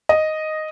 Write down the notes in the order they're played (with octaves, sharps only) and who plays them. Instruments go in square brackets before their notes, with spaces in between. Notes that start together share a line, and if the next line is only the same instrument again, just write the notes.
[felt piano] D#5